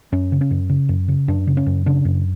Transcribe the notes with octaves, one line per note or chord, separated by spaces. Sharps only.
F#2 C#4
C#3
C#4
F#2
C#3
F#2
C#3
F#2 D4
C#3
C#4
F#2
C#3 D4
F#2